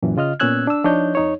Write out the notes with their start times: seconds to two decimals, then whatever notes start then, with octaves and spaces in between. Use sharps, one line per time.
0.03 F#2 A#2 E3
0.17 C#3 F4 D#5 F6
0.40 A#2 B3 C#4 E6 F#6 G#6
0.67 D4 E6
0.84 F3 D4 D#4 C#5 D#5 G6
1.15 F2 D#4 C#5